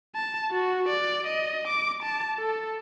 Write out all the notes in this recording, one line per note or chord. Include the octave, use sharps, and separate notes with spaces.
A5
F#4
D5
D#5
D6
A5
A4